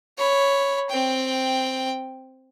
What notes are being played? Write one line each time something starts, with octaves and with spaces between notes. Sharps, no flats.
C#5 B5
C4 G5